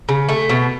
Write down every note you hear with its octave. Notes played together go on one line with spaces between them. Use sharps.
C#3
A3
B2